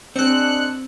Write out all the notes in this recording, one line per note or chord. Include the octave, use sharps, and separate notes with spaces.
G#3 C4 D4 F#6 C#7